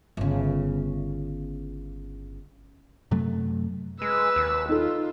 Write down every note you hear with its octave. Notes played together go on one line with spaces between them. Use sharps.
G1 C#3
F#2 C3 F#3 A3
G#3 B4 E6
D#2
D#4 F4 A4